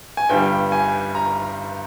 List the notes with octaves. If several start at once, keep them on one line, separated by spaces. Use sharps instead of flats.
G#5
G1 G2 G3 G5
G#5
A#5